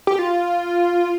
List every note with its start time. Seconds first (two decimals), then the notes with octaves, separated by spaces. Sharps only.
0.07 G4
0.19 F4